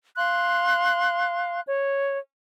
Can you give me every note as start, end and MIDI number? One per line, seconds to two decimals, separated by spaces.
0.17 1.60 77
0.17 1.60 84
0.17 1.60 90
1.67 2.18 73